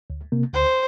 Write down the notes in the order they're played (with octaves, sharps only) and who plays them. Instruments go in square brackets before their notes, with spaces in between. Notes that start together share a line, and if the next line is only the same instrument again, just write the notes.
[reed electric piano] D2
C3 A#3
[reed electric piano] D2 [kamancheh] C5